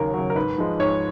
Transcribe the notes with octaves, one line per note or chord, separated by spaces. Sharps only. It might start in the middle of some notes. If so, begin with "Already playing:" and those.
Already playing: D#2 C#3 F#3 A#4
C#3 F#3
A#4
G#2 B4
F3 G#3
G#2 C#5